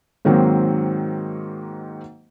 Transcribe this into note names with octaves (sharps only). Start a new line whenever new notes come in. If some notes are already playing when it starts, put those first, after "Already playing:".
G#2 D#3 F#3 A#3 C4